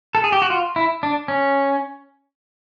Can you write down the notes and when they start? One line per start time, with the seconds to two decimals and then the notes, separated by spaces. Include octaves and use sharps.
0.15 A4
0.24 G#4
0.32 G4
0.42 F#4
0.50 F4
0.76 E4
1.03 D4
1.28 C#4